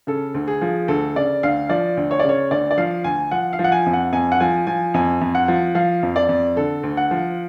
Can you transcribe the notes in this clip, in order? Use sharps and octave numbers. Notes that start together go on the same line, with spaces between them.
C#3 A4
D2
G#4
F3
D2 A4
C#3 D5
D2 F5
F3 D5
D2
C#5
C#3 D5
C#5
D2 D5
D5
F3 F5
D2 G#5
F3 F#5
F5
F3
F#5
G#5
F2
F#5
F2 G#5
F#5
F3 G#5
F3 G#5
F2 G#5
F2
F#5
F3
F3 F5
F2
D5
F2
D3 A4
D2
F#5
F3